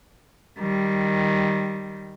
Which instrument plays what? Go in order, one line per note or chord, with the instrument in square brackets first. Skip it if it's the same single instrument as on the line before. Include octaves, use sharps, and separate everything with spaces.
[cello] D#3 G3